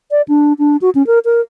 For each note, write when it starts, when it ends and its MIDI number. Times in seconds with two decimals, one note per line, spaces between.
0.11 0.22 74
0.28 0.53 62
0.59 0.77 62
0.82 0.90 66
0.95 1.05 61
1.07 1.19 70
1.25 1.41 70